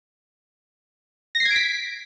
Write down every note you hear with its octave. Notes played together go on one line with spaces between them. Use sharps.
A#6
C7
G#6
D7
B6